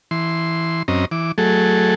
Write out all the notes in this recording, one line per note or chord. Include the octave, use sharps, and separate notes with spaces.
E3 C6
F#2 C4 C#4 D#5 A#5
E3 D6
F#3 A3 G#4 A4